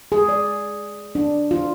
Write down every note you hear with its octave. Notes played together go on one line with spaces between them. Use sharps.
G#4
D5
D4
F4